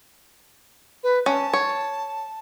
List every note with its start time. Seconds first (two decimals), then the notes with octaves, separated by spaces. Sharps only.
1.03 B4
1.26 C#4 A5
1.53 C#5